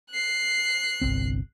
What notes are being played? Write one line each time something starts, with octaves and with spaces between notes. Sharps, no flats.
F#6 C7
G1 C2 C4